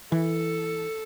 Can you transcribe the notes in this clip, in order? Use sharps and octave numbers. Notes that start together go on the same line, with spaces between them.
E3 A4